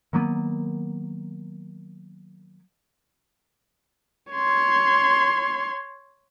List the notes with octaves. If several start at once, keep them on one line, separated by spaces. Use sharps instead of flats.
D#3 F#3 A#3 B3
C#5 C6